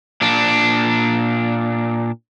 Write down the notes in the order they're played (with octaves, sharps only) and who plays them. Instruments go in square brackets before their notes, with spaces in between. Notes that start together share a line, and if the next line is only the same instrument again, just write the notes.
[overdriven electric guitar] A#2 D4